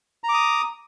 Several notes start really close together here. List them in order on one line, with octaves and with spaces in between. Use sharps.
A#5 D6 D#6